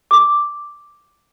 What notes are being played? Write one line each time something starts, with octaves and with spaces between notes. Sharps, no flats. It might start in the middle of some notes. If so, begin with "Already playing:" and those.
D6